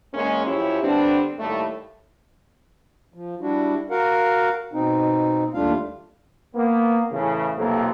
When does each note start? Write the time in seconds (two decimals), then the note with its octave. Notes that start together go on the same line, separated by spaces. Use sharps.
0.13 E2 G#3 A#3 C#4
0.47 F#2 F3 C#4 E4 G4 C#5
0.83 D3 G3 B3 C4 D4
1.39 D#2 A2 G3 A3
3.14 F3
3.41 G3 D4 E4 F#4
3.90 F#4 A#4 F5 F#5
4.73 B2 C4 D#4
5.54 D#2 G3 A3 D4 F4 F5
6.55 A#3 B3
7.12 A2 C#3 E3
7.56 B1 F2 C3 F#3 A#3 A4